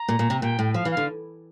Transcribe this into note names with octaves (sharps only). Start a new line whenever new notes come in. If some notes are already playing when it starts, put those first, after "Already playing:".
Already playing: A#5
A#2
A#2
C3
A#2 G5
A2
F3 F5
E3
F5
D3